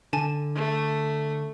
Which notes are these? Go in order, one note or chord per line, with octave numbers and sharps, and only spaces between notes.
D3 G#5 A5
A3